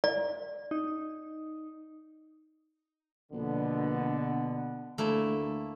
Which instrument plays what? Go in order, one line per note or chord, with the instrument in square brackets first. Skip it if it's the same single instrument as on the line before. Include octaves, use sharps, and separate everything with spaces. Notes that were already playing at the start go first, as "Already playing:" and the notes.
[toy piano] D5
[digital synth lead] D#4
[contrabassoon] A#1 [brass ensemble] B2 D3 B3
[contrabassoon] D2 [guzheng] A3 A#3 E4